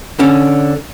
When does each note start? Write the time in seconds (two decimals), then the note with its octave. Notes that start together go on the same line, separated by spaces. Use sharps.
0.19 D3 C#4